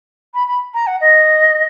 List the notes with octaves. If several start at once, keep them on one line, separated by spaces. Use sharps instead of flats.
B5
B5
A#5
F#5
D#5